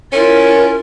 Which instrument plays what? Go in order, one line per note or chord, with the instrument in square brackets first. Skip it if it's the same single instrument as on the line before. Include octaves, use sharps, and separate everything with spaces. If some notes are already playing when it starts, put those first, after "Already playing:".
[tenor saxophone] C#4 [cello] E4 F4 [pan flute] A#4